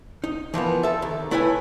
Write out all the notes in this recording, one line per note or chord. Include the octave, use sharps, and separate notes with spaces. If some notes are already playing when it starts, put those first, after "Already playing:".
D#4
E3 F3 A#3 B3
A4 E5
D#2
A3 E4 B4 C#5 F5 G#5